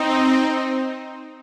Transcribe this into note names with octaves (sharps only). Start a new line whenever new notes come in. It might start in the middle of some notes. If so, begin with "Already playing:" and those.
Already playing: C4 D#4